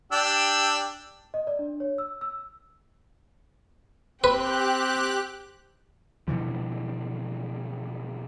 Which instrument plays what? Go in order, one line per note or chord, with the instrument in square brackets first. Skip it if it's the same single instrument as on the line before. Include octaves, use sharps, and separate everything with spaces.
[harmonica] D4 G4 E6
[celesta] D#5
D5
D4
C#5
E6
E6
[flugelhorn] C4 [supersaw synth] G4 F#6 [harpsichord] B4 [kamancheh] G5
[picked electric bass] B2 D3 E3 F3